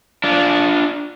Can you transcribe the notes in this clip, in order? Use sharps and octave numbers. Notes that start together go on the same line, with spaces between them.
D4 F4